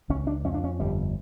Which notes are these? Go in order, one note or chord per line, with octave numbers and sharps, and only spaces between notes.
C#2 C#4
D4
F2 C#4
D4
C#4
G1 G3